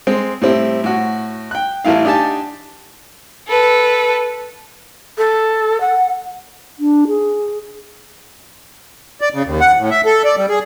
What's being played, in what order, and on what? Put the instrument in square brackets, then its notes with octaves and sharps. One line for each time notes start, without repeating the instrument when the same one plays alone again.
[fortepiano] G#3 C4
A2 G3 C4 E4
A2 F#4
G5 F#6
A1 E3 A3 E4 F5
D4 D#4 G4 G#5 A5
[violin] A4 B4
[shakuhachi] A4
F#5
[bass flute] D4
G#4
[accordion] D5
C#3
D#2
F#5
A2
E5
A4
D5
G3
G#4